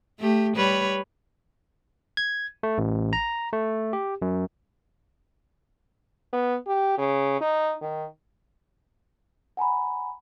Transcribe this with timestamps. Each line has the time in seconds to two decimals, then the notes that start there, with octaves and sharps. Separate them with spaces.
0.20 A3 G4
0.56 G3 B4 C#5
2.17 G#6
2.63 A3
2.78 A1
3.13 A#5
3.53 A3
3.93 G4
4.22 F#2
6.33 B3
6.67 G4
6.98 C#3
7.41 D#4
7.81 D#3
9.57 F#5 G#5 A#5 B5